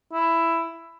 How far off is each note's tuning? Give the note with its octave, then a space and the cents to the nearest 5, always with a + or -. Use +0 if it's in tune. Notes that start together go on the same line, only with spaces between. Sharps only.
E4 +10